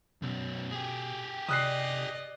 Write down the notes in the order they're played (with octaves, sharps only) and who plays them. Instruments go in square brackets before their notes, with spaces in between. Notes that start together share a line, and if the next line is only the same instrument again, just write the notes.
[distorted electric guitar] B1 F#2 [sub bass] B2
[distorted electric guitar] G4 G#4
[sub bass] C3 [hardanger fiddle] D5 D#5 [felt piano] D#6 F#6 C7